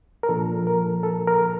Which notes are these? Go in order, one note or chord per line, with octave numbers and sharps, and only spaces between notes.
A#4
A#2 F3 A#3 D4 A4
A#4
A4
A#4